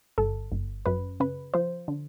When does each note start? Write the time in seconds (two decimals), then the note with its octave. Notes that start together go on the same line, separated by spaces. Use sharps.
0.18 G1 A4
0.52 G1
0.86 F#2 B4
1.20 C#3 B4
1.54 F3 C5
1.88 D3